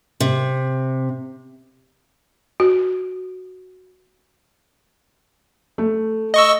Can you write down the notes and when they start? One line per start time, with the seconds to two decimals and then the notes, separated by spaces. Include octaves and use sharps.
0.20 C3
2.60 F#4
5.78 A3
6.34 D#5 C#6 E6